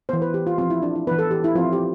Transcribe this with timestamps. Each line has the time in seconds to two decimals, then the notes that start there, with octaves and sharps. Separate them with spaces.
0.09 E3 B3 C5
0.22 B4
0.34 G4
0.47 F4
0.58 F3 C4 F4
0.70 E4
0.83 D4
0.95 E4
1.07 E3 B3 B4
1.19 A4
1.31 G4
1.44 E4
1.55 F3 C4 F4
1.73 G4